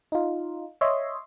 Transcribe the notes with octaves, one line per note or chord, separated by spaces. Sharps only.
D#4 F4
C#5 D#5 E5 C6